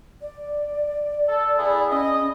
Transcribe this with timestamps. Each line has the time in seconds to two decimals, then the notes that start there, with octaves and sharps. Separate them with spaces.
0.22 D5
1.28 A4
1.57 B3 E4 G#4
1.91 C#4 D#5